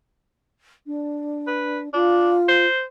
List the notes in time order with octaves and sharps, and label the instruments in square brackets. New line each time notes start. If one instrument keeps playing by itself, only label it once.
[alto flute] D4
[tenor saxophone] B4
[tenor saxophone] D4 [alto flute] F4
[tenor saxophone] C5